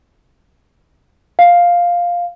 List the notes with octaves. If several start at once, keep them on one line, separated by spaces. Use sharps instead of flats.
F5